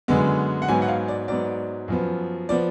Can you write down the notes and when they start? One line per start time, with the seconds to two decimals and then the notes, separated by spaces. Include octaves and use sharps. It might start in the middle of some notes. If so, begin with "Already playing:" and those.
0.08 F#2 D3 G#3 B3
0.62 F#5
0.68 G#2 F#3 B3 G#5
0.82 F#5
0.88 F5
1.08 D5
1.28 G#2 F#3 B3 D5
1.88 F#2 F3 B3
2.49 F3 B3 D5